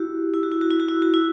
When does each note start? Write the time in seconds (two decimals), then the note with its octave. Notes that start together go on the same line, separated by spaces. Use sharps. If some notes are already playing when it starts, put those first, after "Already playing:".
Already playing: E4 F#4 G4
0.34 E4
0.43 F#4
0.52 E4
0.61 F#4
0.71 E4
0.80 F#4
0.89 E4
1.02 F#4
1.14 E4